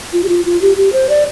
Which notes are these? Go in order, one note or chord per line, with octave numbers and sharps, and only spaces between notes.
F4
G4
F4
F4
G4
G4
C5
D5